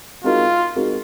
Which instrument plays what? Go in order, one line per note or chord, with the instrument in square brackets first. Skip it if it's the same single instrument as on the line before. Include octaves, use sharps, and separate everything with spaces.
[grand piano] G#3 C4 D#4 F#4 A#4 [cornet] F4
[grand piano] G#3 C4 D#4 F#4 A#4